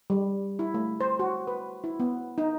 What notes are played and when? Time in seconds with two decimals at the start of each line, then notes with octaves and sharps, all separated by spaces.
0.10 G3
0.59 E4
0.74 A3
1.00 C5
1.19 F#4
1.47 B4
1.84 E4
2.00 B3
2.38 D#4